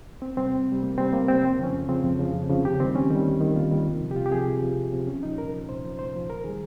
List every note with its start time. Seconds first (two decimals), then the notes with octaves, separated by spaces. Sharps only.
0.22 C2 C4
0.37 C3 G3 C4
0.52 C2
0.68 C3 G3
0.82 C2 A#3
0.98 C3 G3 C4
1.13 C2 A#3
1.28 C3 G3 C4
1.43 F2
1.59 C#3 F3 C#4
1.73 F2
1.89 C#3 F3 C4
2.04 F2
2.19 C#3 F3
2.34 F2
2.50 C#3 F3
2.65 D#2 G4
2.80 D#3 G3 C4
2.95 D#2 C#4
3.10 D#3 G3
3.26 D#2
3.41 D#3 G3
3.56 D#2 F4
3.71 D#3 G3
3.87 C2
4.01 C3 F3
4.11 G4
4.16 C2 F4
4.26 G4
4.31 C3 F3 G#4
4.47 C2
4.62 C3 F3
4.77 C2
4.93 C3 F3
5.07 C2 C#4
5.23 A#2 F3 D#4
5.38 C2 A#4
5.53 A#2 F3
5.69 C2 C5
5.84 A#2 F3
5.99 C2 C5
6.14 A#2 F3
6.29 D#2 A#4
6.44 D#3 G3 G#4